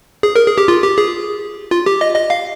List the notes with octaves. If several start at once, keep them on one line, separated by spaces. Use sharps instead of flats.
G#4
A#4
G#4
G4
F4
G4
G#4
F4
G4
D#5
D#5
F5